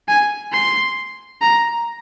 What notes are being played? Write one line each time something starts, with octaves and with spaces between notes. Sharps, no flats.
G#5
C6
A#5